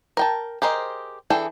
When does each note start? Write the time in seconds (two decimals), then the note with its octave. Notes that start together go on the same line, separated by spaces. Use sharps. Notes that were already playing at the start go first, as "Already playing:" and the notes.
0.17 A#4 G5 A5
0.62 G4 G#4 A#4 C5 D#5
1.30 E3 D4 G#4 A4 G5